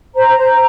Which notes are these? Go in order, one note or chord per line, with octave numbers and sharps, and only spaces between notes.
C5 A#5
C5